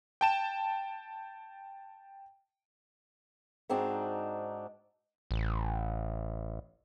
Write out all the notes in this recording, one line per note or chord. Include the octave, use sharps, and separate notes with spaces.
G5 A5 E7
G#2 C4 D4 D#4 F#4
A1